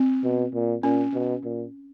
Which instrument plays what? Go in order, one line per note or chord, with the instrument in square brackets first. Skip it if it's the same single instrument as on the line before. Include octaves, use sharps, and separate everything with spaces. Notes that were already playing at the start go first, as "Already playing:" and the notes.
Already playing: [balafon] C4
[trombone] B2
A#2
[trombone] A#2 [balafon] C#4
[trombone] B2
A#2